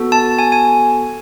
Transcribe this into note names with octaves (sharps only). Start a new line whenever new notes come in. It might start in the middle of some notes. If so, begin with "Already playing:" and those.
Already playing: B3 F#4 A4
A5
G#5
G#5